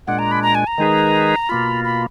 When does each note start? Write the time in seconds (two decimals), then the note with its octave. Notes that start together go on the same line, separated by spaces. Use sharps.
0.07 A#2 G#3 D4 F#5
0.19 A#5
0.31 B5
0.42 A#5
0.55 G#5
0.67 A#5
0.78 D#3 G#3 D#4 G#4 B4
1.49 B2 A#3 F4 B5
1.84 B5